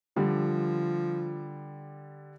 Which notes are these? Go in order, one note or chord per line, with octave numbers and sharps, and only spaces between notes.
D3 F3 G3